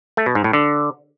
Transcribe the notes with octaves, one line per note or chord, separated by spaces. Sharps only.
A3
B2
G#2
A2
D3